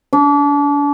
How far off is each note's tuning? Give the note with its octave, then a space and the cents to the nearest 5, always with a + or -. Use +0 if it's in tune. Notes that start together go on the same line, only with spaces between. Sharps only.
D4 -35